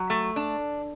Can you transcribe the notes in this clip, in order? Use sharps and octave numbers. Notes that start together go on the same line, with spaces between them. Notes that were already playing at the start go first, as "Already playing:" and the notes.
Already playing: F#3
A3
D4